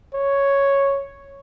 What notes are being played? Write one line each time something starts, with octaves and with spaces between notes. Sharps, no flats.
C#5